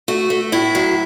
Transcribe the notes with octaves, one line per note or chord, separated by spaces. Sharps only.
A3 F#4
A3
A2 E4
F#3